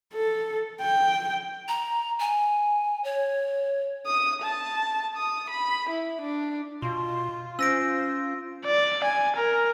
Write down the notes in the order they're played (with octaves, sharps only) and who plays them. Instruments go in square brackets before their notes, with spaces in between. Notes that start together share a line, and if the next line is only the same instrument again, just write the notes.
[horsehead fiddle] A4
G5
[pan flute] A#5
G#5
C#5
[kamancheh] D#6
A5
D#6
B5
E4
D4
[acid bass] B2 [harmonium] F4 [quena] C6
[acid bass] C#4 [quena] C5 [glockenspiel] E6 A#6 D7
[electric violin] D5
G#5
A#4